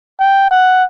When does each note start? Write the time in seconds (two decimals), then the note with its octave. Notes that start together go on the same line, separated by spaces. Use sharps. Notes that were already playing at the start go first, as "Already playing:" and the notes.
0.19 G5
0.51 F#5